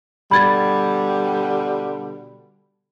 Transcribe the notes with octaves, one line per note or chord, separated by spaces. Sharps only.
B2 D3 G3 B5 G#6 A6